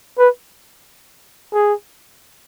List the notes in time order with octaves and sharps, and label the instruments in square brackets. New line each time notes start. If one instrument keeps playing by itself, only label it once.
[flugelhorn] B4
G#4